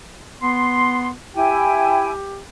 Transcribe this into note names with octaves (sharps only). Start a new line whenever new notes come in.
B3 C6
E4 G4 G5 G#5